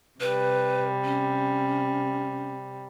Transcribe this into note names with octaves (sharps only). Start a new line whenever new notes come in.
C3 G3 B4
C#4